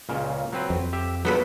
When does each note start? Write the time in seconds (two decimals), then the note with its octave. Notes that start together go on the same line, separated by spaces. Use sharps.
0.09 C#2 A#2 C#3
0.53 F#3 C4 B4
0.70 F2
0.93 G4 E5
1.25 A#1 F3 F#3 B3 A4 B4